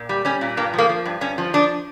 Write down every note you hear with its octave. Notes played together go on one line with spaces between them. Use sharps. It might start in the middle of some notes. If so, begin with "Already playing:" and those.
Already playing: A#2
G3
G3 C#4
A#2
G2 A#3
F3
A#3
F3
G2
G2 C#4
F3
F3 D4